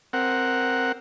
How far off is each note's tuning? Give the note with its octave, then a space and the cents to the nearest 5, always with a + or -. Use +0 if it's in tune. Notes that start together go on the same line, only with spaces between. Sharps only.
C4 +0 A#4 +0 F#5 +0